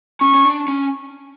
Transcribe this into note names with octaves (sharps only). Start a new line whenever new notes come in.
C#4 C#6
C#4
D4
C#4